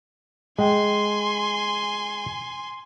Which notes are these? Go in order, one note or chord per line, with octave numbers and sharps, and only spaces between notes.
G#3 G5 G#5 C6